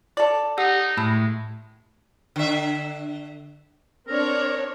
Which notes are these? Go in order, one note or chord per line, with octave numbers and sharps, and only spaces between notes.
A4 D5
D#4 G4 F#5 E6
A2 G#3 A5 B5 E6
D3 E5
C4 D4 A#4 C#5